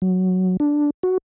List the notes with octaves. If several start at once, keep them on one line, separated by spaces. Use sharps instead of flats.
F#3
D4
F#4